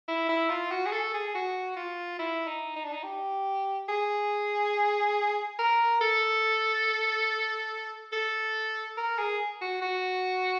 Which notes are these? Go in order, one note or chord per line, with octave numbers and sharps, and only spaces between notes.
E4
E4
F4
F#4
G#4
A4
G#4
F#4
F4
E4
D#4
D#4
D4
D#4
G4
G#4
A#4
A4
A4
A#4
G#4
F#4
F#4